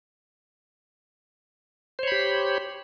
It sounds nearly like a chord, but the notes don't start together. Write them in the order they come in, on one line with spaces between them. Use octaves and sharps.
C5 C#5 B5 G4